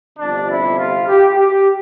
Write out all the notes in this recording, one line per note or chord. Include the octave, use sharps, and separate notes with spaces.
G1 F2 C3 D4
E4
F4
G4
G4